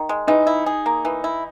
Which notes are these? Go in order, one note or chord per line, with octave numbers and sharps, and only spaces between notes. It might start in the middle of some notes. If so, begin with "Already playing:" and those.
Already playing: D#3
G#3
E3 D#4
E4
G#4
A#3
E3
E4